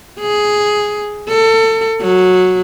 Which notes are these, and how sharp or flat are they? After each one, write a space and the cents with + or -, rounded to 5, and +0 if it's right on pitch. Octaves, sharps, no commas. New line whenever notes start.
G#4 +5
A4 +25
F#3 -10